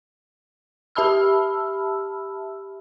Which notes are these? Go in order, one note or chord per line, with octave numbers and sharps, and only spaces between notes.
G4 E5 A5 B5 E6 F6